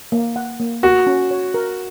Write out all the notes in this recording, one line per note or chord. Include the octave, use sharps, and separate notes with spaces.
A#3
F#5
A#3
F#4 A#4
C#4
C#5
A#4